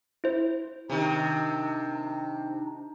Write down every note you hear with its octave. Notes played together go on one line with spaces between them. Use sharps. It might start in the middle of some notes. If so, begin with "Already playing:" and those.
E4 C5
C3 D#3 D4 D#4